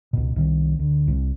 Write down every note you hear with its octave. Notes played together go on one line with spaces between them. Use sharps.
C#2 B2
C2 D#3
D2
C2